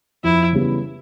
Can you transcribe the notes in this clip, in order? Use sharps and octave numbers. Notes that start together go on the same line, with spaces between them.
F2 E4
C#3 E3 G3 B3